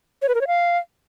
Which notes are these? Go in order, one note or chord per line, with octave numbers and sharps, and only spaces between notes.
C#5
B4
A#4
C#5
F5